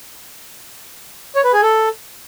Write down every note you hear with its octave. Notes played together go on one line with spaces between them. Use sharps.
C#5
B4
G#4
A4